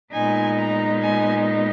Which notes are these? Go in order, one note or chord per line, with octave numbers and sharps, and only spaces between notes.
A#2 G#3 B3 D#4 G#5
A#5
G#5